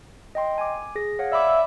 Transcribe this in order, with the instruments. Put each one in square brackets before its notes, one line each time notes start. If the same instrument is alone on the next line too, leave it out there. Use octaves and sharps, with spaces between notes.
[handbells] D#5 G5 C6
G#5 D6
G#4 A#6
C#5 F5 F#5
[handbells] D5 B5 D6 [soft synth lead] E5